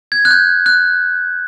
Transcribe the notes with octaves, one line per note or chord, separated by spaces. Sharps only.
G#6
F#6
G6
F#6